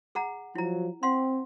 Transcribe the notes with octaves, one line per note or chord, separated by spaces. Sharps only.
G#4 F#5 A#5
F3 F#3 E4 A#5
C4 F5 F#5 C6